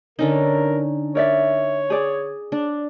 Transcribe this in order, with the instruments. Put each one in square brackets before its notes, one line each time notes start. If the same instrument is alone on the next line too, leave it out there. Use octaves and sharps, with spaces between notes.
[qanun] D3 C#4 D#4 [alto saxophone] A#4
[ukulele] A#4 D5 E5 [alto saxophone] C#5
[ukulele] G#4 D5
[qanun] D4